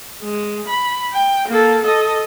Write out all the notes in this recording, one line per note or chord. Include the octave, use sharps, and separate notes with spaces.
G#3
B5
G5
A#3 A4
A4 D#5